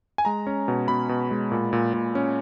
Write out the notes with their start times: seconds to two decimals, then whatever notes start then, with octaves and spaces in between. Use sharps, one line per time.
0.18 G#5
0.25 G#3 A#5
0.47 C#4
0.68 B2
0.88 B2 B5
1.09 B2
1.31 G#3
1.51 A#2
1.73 A#2
1.94 A#2
2.15 C#4